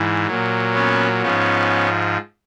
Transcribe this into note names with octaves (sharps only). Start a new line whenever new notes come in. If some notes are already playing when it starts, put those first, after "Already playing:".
Already playing: G#2 E3
A#2 F#3
B3 C#4
G#2 F3 B3 C#4